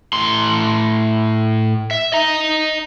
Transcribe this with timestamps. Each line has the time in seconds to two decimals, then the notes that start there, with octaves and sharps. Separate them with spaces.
0.13 A2 C6
1.91 E5
2.13 D#5 A#5